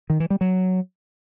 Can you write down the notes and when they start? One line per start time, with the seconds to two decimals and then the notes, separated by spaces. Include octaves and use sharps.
0.10 D#3
0.20 E3
0.30 G3
0.41 F#3